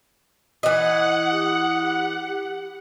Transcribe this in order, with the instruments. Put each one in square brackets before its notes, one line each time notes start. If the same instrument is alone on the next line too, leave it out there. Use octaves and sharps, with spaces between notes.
[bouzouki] E3 D#5 [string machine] F#5
[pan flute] G4